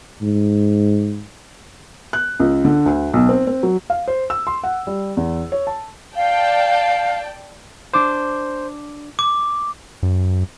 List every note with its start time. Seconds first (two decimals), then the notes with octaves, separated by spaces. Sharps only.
0.22 G#2
2.13 F#6
2.40 C#2
2.65 D3
2.86 D2
3.13 B1
3.29 C4
3.47 C4
3.63 F#3
3.90 F5
4.08 C5
4.30 E6
4.47 C6
4.64 F#5
4.87 G3
5.17 E2
5.52 C#5
5.67 A5
6.15 D5 F5 G5 A5
7.94 D4 C5 D6
9.19 D6
10.03 F#2